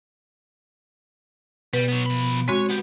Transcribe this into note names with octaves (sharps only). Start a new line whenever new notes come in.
B2 G3 B4
F#3 B3
F3 B5
G#3 C4 F#4 C#5
B3 G4